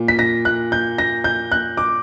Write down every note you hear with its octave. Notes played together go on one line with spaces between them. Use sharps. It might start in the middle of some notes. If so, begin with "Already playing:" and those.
Already playing: A#2
B6
A#6
F#6
G6
A#6
G6
F#6
D6